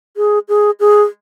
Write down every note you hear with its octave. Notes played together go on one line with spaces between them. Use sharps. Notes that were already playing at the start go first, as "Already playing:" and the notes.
G#4
G#4
G#4